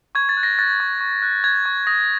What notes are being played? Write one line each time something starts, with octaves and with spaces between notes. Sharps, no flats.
C#6 G#6
A6
F#6
A#6
F#6 A6
C#6
C#6
F#6
F#6 G#6
C#6
D#6 A#6